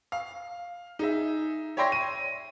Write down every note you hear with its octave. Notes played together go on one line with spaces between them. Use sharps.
F5
D#4 G#4 E5
C#5 D5 E5 G5 C6 A#6
D#7